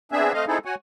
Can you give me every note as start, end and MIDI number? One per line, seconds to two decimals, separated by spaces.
0.12 0.33 59
0.12 0.33 60
0.12 0.33 62
0.12 0.33 68
0.12 0.33 76
0.34 0.45 57
0.34 0.45 60
0.34 0.45 75
0.34 0.45 77
0.48 0.58 60
0.48 0.58 63
0.48 0.58 64
0.48 0.58 68
0.48 0.58 69
0.65 0.75 66
0.65 0.75 73
0.65 0.75 78
0.65 0.75 80